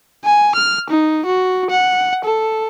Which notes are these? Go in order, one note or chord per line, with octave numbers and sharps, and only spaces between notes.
G#5
F6
D#4
F#4
F#5
A4